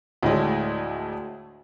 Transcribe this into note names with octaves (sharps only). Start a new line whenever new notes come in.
D2 A2 G#3